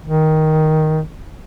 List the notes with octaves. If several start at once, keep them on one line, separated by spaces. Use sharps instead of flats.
D#3